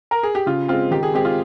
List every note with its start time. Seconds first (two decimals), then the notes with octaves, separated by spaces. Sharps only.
0.11 A#4
0.23 G#4
0.35 G4
0.46 C#3 F4
0.68 G#3 C4 F4
0.91 D#3 G4
1.03 G#4
1.14 G#3 C4 G4
1.25 F4